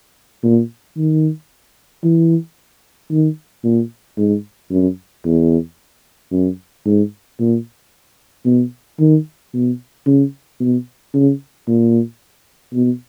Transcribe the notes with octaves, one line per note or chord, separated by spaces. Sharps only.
A#2
D#3
E3
D#3
A#2
G#2
F#2
E2
F#2
G#2
A#2
B2
D#3
B2
C#3
B2
C#3
A#2
B2